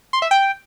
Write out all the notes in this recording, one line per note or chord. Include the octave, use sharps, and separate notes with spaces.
C6
E5
G5